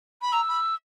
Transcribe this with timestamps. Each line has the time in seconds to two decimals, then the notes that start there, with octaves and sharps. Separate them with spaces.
0.21 B5
0.32 A#5 E6
0.48 B5